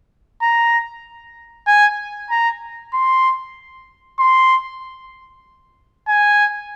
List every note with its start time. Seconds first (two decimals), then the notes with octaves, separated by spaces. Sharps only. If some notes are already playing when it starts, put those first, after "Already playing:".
0.42 A#5
1.68 G#5
2.31 A#5
2.94 C6
4.19 C6
6.08 G#5